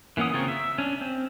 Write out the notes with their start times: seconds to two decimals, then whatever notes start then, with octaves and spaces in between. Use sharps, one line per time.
0.17 E3 A#3 C#4 F#5 D#6
0.33 C#3 C4 F4 A#4 C#5
0.48 E5
0.78 C#4 D4
1.01 C4